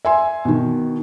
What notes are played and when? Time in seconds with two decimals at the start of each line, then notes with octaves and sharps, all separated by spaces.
0.05 E5 G#5 C6
0.45 B2 D#3